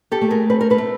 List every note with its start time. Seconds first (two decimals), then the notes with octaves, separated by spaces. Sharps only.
0.11 G4 A4
0.21 A3
0.31 G#4 A#4
0.50 C4 B4
0.61 A#4
0.70 A4 B4
0.78 A3